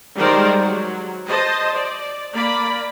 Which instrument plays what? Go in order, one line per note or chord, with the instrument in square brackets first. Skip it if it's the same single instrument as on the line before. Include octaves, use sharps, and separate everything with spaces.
[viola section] D#3 G3 G#3 A#4 C5 D5
F#3
C5 D#5 A5
D5
A#3 D5 B5